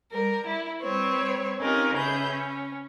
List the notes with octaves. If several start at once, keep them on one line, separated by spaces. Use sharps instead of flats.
G3 A#4
E4
G3 C4 B4 C#5
C4 C#4 D#4 F4 G4 A#4
C#3 G#4 B4 C#5 E5 G6
C#4